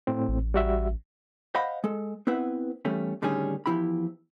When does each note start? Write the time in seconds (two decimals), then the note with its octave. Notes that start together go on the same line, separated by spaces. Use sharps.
0.07 A2 C4
0.28 A1
0.54 G3 F#4 E5
1.55 C5 D#5 F5 F#5 B5
1.84 G#3 A4
2.27 B3 C4 E4 B4 E5 F#5
2.85 E2 G3 A3 C#4
3.22 A2 D3 D#3 G3 C#4 G#4
3.66 E2 C#3 F3 E4 G4 B5